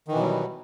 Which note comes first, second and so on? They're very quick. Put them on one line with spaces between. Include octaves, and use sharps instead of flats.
D#3 E3 B2 F#3 G3